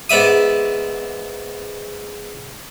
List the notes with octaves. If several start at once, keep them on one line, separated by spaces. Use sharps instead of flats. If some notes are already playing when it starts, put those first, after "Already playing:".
G#2 B3 D5 E5 D#6